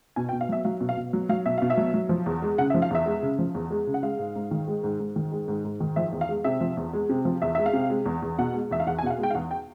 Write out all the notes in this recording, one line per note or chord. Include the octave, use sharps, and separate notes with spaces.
B2 G#5
G5
B2
F5
F#3 E5
F#3 F5
B2
F5
B2
F#3
F#3 F5
B2 E5
B2 F5
E5
F#3
F#3
F3
E2
G#3
C#3 F#5
E5
F3
F5
E2 E5
G#3
C#3
F3
E2
G#3
C#3
F#5
G#3 F5
G#2
G#2
D#3
G#3
G#2
G#2
D#3
G#3
G#2
G#2
D#3
F3 E5
E2
F5
G#3
C3 E5
F3
E2
G#3
C3
F3
E2 E5
G#3 E5
F5
C3
G#3
E2
E2
B2 F#5
G#3
E2 E5
F5
E2 F#5
G#5
B2 F#5
F5
G#3 G5
F5
E2 F#5
G5